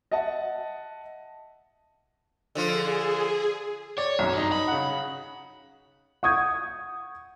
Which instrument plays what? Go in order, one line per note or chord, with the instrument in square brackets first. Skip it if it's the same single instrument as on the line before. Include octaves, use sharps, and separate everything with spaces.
[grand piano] D#5 E5 F#5 A5
[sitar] D3 F3 F4 [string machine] G#4
[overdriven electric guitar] C#5 [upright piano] D5
[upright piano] B1 F#2
[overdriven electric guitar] G2 [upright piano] D#4 A#5
[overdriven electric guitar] B5
[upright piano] C#3 F#5
F#5 C#6 D#6 G6 G#6